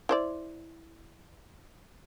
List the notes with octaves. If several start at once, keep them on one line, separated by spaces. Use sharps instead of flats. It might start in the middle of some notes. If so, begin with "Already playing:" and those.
E4 C5 D5